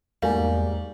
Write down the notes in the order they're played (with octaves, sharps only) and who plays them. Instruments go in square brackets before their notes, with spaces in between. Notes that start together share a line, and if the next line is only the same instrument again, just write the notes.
[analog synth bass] E2 [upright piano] G#2 A#3 F#4 [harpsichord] G3 [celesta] F5 G#5